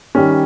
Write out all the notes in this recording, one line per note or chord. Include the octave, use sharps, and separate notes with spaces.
D#3 G3 C#4